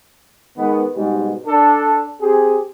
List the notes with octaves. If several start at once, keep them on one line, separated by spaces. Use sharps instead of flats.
D#3 G#3 B3
G#2 B2 G3 G#3
D4 A4
C4 G4 G#4